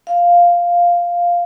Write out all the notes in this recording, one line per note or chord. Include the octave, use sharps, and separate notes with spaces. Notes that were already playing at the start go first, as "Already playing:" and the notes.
F5